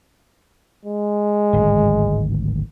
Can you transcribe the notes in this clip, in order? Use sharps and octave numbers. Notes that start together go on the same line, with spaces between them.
G#3
D1 G#1